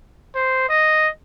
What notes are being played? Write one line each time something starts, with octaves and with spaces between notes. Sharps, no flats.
C5
D#5